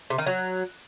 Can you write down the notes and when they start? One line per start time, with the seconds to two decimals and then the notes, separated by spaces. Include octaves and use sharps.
0.10 C3
0.18 D#3
0.26 F#3